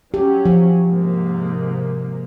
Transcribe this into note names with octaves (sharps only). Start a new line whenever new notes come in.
F#3 C#4 G4
F3
G#2 C3 A#3